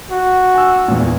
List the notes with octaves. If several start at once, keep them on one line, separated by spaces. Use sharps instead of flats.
F#4
G#5 E6
E2 A#2